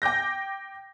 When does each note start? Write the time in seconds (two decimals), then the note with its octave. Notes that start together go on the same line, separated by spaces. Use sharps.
0.02 G5 D6 G6 A#6